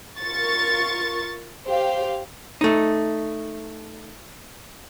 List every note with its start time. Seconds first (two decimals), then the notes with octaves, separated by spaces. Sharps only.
0.20 F4 A#4 C#6 A6
1.67 G4 C5 F5 G5
2.61 A3 D#4